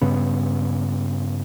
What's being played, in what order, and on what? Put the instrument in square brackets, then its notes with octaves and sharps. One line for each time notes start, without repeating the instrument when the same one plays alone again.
[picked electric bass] G2 C#3 B3